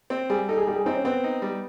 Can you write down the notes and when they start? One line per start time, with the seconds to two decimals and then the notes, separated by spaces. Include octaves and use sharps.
0.10 C4
0.30 G3 G#4
0.48 D#4 A4
0.57 G#4
0.67 G3 G4
0.76 G#4
0.86 C4 D#4
0.95 C#4
1.05 B3 C4
1.23 D#4
1.42 G3